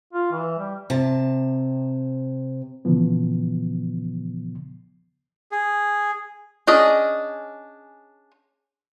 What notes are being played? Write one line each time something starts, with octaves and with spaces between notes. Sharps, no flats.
F4
E3
G3
C3 A5
A#2 C#3 E3 F3 B3
G#4
C#4 D4 G#4 D#5